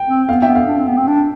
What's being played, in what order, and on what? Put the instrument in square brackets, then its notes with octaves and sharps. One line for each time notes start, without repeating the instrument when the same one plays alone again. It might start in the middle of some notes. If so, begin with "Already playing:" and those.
Already playing: [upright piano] G5
[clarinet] C4
[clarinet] B3 [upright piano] F5
[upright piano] E5 G5
[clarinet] B3
[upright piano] F5
[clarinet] D4
C4
B3
C4
D4